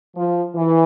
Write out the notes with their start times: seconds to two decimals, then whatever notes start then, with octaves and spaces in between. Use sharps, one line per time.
0.16 F3
0.55 E3